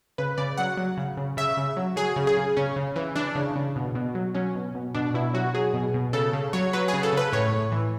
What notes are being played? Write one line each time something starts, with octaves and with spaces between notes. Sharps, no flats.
C#3 B4
C#3 D5
F#3 F#5
F#3
C#3
C#3
C#3 E5
C#3
F#3
F#3 G#4
C#3
G#4
C#3
C#3 C#4
C#3
E3
E3 D4
C#3
C#3
B2
B2
F#3
F#3 C#4
B2
B2
B2 D4
B2 E4
F#3 F#4
F#3 G#4
B2
B2
C#3 A4
C#3
F#3 C#5
F#3 B4
G#4
C#3
A4
C#3 B4
A2 C#5
A2
E3